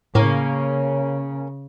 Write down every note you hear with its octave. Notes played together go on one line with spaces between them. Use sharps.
A2 C#3 A#3 C#4